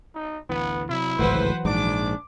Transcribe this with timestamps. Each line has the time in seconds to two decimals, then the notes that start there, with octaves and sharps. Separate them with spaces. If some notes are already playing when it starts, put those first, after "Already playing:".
0.15 D#4
0.49 A1 D2 E3 B3
0.89 C3 F#3 E4
1.19 G#1 C#2 A2 E3 F#3 B4 C5 F#5
1.65 A#1 G#2 D4 D6